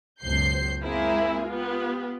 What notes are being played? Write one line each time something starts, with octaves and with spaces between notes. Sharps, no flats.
C#2 F#2 B2 C5 G6 C7
G#3 A#3 C4 E4 G#4 A#4
B3 F4 G4